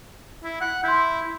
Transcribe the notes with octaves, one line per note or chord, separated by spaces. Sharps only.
E4
F#5
E4 C6 G6